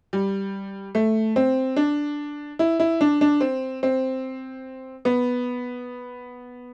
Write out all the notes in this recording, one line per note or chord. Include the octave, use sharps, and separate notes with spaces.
G3
A3
C4
D4
E4
E4
D4
D4
C4
C4
B3